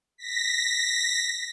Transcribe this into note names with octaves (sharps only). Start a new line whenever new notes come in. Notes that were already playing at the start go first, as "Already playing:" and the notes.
A#6 B6